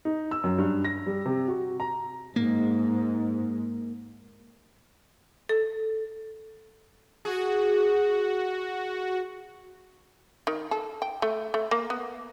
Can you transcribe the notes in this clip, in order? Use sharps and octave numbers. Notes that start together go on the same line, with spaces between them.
D#4
E6
F#2
G2
A#6
G3
C3
F#4
A#5
G#2 A#3
A4
F#4 G#4
D#3
A4
G5
A3
A3
A#3
B3